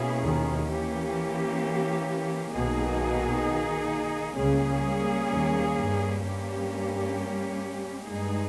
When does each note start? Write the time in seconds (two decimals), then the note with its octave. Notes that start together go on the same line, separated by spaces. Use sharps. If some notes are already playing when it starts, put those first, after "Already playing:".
Already playing: B2 A#3 C#4 E4 G#4
0.21 D#2 D#3
0.68 E3 A#3 C#4 G4
2.52 B1 B2 D#3 A#3 D#4 G#4
4.37 C#2 C#3 G3 A#3 C#4 G#4
5.30 D#2 D#3
5.76 G2
6.22 G2 G3 A#3 C#4 G4
8.07 G2 G#3 D#4 G#4